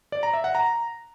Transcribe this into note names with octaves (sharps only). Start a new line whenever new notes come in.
D5
A#5
E5
F#5
A#5